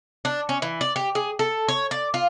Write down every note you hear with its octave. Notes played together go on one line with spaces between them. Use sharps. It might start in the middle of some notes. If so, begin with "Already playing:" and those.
D4
C#4
E3
D5
G4
G#4
A4
C#5
D5
F4